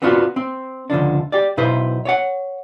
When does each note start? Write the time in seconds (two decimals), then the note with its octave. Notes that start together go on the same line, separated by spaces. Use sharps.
0.02 B3 C4 D4 F4 F#4 B4
0.36 C4
0.90 C#2 D3 F3 D4
1.32 G4 D5
1.57 B1 B2 E4 B4 C5
2.05 C#5 D5 F#5